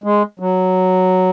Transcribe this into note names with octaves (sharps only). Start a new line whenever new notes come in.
G#3
F#3